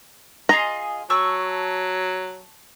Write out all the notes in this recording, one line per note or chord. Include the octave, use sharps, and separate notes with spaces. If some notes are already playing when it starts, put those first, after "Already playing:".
F4 G#4 D#5 A#5
F#3 A5 C#6 E6